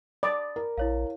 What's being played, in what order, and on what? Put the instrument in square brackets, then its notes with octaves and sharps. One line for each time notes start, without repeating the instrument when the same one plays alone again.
[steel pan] D5 [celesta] B5 D#6 A6
[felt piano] A#4
[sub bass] A#1 [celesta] E4 C#5 F5